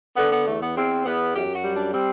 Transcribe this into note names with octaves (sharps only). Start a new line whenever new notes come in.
D3 B3
B3
E2 A3
B3
E2 C4
E2 B3
F#2 G4
F#4
G3
D4
G3 C4